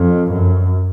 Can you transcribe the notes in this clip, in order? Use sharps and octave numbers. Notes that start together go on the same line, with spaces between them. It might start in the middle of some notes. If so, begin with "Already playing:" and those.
Already playing: F2
F#2